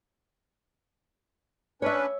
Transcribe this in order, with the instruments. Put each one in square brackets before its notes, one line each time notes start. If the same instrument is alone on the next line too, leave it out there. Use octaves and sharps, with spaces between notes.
[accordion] C#4 D4 B4 [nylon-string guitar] C#5 E5